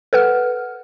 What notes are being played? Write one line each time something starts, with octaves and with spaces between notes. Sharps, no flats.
A4 B4 F#5 F6